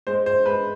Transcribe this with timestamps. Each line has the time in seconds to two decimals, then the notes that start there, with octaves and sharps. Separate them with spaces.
0.07 G#3 C5
0.26 C5
0.46 G#3 B4